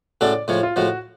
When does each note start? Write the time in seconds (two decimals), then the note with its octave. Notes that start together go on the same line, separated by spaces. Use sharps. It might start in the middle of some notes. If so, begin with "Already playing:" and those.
0.21 A2 G#3 C#4 F#4 A4 D5
0.48 A2 F3 G#3 C#5
0.63 F4
0.76 A2 F3 G#3 F#4